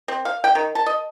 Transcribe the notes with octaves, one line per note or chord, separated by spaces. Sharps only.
C4
F5
G5
D#3
A5
D#5